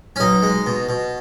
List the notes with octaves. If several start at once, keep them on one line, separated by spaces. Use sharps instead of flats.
C#4
B1 D#4
G#3
B2
B2